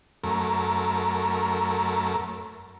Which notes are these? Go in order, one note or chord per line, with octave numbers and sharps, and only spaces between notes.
F#2 A3 A#4